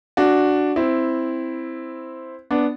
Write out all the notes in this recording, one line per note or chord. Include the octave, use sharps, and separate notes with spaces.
D4 F#4
C4 E4
B3 D4